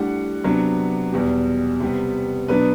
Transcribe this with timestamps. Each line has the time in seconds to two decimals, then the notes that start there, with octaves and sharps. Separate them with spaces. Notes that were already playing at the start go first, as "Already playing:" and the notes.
Already playing: A2 G3 D4 F#5
0.44 C3 F#3 B3 D4
1.13 E2 B2 G3
1.80 C3 G3 B3
2.48 B2 F#3 B3 D4 B4